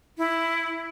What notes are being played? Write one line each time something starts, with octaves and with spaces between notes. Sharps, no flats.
E4